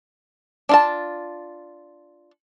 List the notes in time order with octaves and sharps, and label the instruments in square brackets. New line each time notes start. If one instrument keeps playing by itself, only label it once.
[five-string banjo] D4 F4 A5